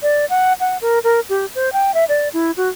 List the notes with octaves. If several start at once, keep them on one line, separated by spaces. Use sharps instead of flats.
D5
F#5
F#5
A#4
A#4
G4
C5
G5
E5
D5
E4
F#4